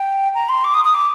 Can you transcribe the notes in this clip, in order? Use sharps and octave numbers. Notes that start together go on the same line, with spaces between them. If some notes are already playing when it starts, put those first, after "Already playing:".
Already playing: G5
A#5
C6
D6
D#6
D#6
D6